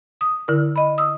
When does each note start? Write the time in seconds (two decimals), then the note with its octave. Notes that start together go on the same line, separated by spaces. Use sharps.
0.21 D#6
0.48 D3 E4 A#4
0.76 D#5 B5
0.98 D#6 E6